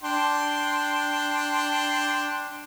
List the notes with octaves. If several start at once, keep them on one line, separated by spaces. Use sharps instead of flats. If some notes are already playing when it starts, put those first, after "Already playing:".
D4 G5 C6